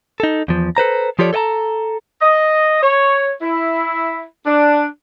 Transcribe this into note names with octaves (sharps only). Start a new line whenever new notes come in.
D#4 A4
E2 F3
A4 B4 C5 A#5
F3 F4 G4 A4 C#5 D5
A4 C#5 D#5 A5 A#5
D#5
C#5
E4
D4